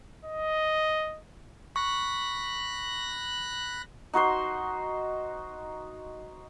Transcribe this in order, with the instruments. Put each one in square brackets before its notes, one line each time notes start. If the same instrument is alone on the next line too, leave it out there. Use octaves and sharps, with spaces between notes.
[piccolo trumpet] D#5
[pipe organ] B5 F#6 A#6 [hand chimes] C#6
[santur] D#4 F#4 C5 C6